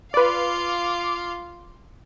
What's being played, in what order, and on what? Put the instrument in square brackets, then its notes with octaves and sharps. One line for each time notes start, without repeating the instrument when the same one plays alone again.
[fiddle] F4 F5 [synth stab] B4 D5 [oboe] D6